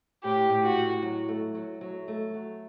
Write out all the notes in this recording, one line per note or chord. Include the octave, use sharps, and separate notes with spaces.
A2 G4
A2
F#4
A2
F#3
A3
F#3
F#3
A3
F#3